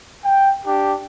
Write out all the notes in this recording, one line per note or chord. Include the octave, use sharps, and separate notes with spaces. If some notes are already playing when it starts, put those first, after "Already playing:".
G5
D4 G4